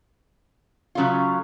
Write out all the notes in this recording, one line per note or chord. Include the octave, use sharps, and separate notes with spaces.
C#3 F#3 A3 C#4 F4